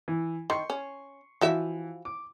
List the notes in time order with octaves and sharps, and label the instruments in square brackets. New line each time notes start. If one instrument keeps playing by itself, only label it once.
[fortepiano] E3
[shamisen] D#3 [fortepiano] C6 C#6
[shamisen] C#4
[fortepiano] E3 [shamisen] F3 F#4 E5
[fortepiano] D6